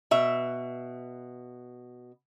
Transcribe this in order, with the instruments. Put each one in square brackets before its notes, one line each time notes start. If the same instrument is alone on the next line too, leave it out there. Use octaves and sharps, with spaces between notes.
[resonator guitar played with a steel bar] B2 E5